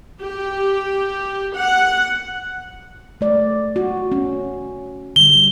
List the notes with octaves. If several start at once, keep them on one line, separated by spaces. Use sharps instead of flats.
G4
F#5
A3 D5
F#4
C#4
D3 G3 G7